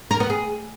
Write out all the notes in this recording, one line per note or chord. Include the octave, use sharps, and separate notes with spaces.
A#4
B3
G#4